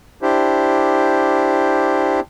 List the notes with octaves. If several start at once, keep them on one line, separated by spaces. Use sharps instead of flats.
D4 E4 G4 C5